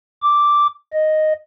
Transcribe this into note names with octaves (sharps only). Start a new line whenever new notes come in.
D6
D#5